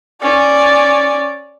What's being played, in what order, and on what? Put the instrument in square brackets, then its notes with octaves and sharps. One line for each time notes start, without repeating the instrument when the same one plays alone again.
[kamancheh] C#4 D5